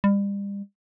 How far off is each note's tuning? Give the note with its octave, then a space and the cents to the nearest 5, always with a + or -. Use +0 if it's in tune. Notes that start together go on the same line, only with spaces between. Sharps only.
G3 +35